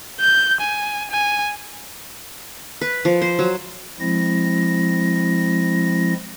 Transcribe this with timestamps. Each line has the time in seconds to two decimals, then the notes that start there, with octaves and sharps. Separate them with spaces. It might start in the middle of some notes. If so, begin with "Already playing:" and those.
0.20 G6
0.60 G#5
1.11 G#5
2.81 B4
3.05 F3
3.22 C5
3.39 F#3
3.99 F3 G#3 C4 E4 A#6